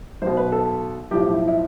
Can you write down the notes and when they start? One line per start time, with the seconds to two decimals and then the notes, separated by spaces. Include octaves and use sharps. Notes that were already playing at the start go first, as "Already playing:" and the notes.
0.22 B1 B2 C5
0.37 B4
0.52 A4
1.11 B1 A2 F3 G4
1.33 E4
1.48 E4